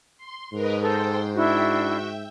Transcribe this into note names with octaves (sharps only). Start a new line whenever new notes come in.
C6
G#2 A#4 B4 D#5
A4 C5 G5 C6
D4 E4 F#4 E5 G5